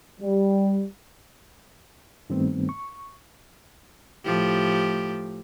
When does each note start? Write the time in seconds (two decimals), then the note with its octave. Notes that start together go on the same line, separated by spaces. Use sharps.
0.21 G3
2.30 G2 D#3 G3 A3 B3 C4
2.69 C#6
4.25 A2 F3 G4